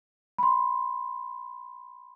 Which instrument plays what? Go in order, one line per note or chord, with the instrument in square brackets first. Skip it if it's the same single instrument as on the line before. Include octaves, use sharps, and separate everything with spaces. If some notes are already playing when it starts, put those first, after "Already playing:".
[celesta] B5 C6